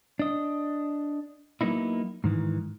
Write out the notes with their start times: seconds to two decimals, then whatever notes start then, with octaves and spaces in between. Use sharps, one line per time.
0.19 D4 D#5
1.61 F#3 A#3 B3 D#4 E4
2.24 G#2 D#3 E3